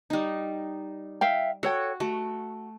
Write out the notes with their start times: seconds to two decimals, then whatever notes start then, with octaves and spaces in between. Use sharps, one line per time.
0.10 G3 D#4
1.21 E5 F5 G5
1.63 F#4 A4 C#5 G5
2.00 A3 F#4